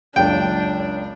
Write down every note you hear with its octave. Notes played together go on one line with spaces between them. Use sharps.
F#1 C#2 D4 G5